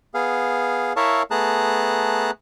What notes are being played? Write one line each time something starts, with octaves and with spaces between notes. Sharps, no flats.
B3 G#4 F5
E4 A#4 C#5 E5 F5 A5
A3 B3 G#4 A5 A#5 F#6